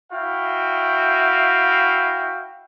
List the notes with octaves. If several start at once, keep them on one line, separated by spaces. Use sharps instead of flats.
E4 F#4 F5 G5